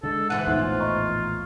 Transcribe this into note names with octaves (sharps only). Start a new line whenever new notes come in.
D3 G#3 A4
G#2 E3 F#5 D#7
A#1 E2 A2 D#4 F4 C5
D#5 A#5 C#6